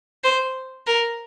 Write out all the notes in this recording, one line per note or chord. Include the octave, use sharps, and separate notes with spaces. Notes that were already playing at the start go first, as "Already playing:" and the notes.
C5
A#4